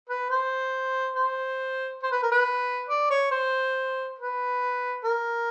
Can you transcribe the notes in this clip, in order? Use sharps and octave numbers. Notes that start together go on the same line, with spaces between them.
B4
C5
C5
C5
B4
A#4
B4
D5
C#5
C5
B4
A#4